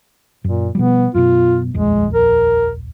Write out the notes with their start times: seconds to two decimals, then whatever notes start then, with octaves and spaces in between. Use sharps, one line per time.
0.44 F#2 A#2
0.75 B2 F3 G3 B3
1.14 F#2 B2 F4
1.74 D#1 A#1 F2 G#3
2.14 A#4